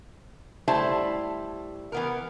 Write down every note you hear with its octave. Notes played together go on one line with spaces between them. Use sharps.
G3 A3 E4 C5 A5
E3 B3 A#4